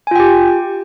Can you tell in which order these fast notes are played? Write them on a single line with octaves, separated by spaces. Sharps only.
G#5 F4 G5 G4